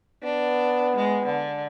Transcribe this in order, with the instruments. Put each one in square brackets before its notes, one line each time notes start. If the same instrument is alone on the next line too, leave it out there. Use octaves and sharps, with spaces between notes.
[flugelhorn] B3 [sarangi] D4
[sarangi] G#3
D3